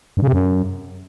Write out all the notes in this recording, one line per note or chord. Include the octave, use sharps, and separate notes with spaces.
G2
C#3
C3
F#2